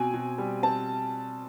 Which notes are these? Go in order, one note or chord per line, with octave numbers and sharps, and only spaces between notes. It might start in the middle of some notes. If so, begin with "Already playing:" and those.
Already playing: B2 C4 G#5
B2
G3
C4 A5